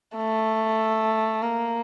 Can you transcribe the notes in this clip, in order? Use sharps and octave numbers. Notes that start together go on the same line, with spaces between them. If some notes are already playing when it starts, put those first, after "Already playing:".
A3
A#3